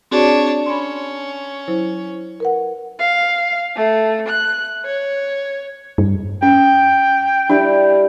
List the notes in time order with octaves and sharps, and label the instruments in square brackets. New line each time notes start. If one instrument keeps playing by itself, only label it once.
[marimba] C4 F#4 G#4 [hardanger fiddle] D4 C#5
[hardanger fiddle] C#4 [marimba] B5 C6
[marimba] F#3 E4 C5
A#4 B4 F#5
[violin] F5
A3
F#6
C#5
[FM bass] G2
[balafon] C#4 [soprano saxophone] G5 [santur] D#6
[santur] G3 E4 B5 [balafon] D4